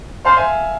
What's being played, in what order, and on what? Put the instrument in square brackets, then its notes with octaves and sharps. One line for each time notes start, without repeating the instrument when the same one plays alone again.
[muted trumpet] C5 [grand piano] F5 A5
[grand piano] E5 G#5